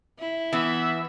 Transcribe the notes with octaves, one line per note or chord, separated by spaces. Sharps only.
E4
E3 B3 E5